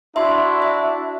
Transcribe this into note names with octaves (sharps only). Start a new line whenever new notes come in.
D4 E4 F#4 E5 C6
E5